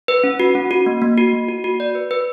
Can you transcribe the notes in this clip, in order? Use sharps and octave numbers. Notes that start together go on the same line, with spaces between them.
B4
C#4
F#4
C#4
F#4
A#3
A#3
F#4
A#3
F#4
F#4
D5
B4
B4